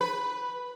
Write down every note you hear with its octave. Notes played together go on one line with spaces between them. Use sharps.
B4